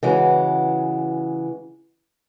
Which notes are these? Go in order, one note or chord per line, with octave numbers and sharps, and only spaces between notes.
C#3 E3 G#3 F#4